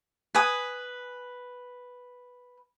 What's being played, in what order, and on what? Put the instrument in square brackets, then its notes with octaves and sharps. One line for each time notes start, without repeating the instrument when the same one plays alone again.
[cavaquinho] B4 G#5 D#6